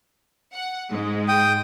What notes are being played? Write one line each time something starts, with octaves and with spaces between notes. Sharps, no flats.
F#5
G#2 G#3
G5 D#6